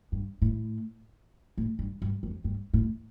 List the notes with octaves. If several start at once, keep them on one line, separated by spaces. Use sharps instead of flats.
G2
A2
A2
G2
G2
F2
G2
A2